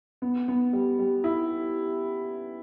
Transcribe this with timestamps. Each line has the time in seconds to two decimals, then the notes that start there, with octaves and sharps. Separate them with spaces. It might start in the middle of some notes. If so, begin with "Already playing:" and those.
0.22 B3
0.48 B3
0.73 G3
0.99 G3
1.24 E4